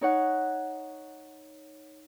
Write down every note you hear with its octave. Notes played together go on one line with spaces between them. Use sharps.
D#4 C#5 F#5